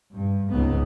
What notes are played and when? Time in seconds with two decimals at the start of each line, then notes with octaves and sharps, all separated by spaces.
0.13 G2
0.52 C#2 G#2 B3